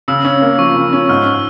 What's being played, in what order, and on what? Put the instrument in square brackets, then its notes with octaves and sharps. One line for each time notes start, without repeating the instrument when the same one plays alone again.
[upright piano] C#3 [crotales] E6
[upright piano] C#4
A#3
[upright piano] F3 [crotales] C#6
[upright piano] C#3
C#4
[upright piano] G#2 [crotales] F6